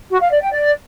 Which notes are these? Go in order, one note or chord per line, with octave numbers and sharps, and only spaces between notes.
F#4
F5
D5
G5
D5